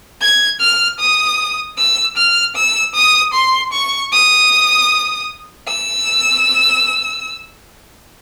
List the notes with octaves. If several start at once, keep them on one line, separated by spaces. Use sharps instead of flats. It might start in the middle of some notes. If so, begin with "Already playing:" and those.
G#6
F6
D#6
E6
F6
E6
D#6
C6
C#6
D#6
E6